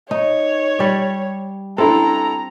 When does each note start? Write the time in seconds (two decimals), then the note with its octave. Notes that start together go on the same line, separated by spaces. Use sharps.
0.11 D#4 C#5
0.79 G3 D5
1.78 C4 D4 E4 A4 A#5